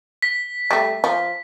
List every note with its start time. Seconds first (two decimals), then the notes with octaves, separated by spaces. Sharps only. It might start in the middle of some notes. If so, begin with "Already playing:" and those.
0.22 B6
0.71 G3 A3
1.04 F3